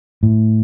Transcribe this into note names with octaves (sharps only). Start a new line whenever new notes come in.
A2